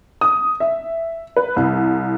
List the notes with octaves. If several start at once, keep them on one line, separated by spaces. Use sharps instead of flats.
D#6
E5
B4
C2